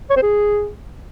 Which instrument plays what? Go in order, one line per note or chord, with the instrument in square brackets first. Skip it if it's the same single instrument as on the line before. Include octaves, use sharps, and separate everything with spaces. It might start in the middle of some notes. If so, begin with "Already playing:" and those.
[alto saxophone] C#5
C5
G#4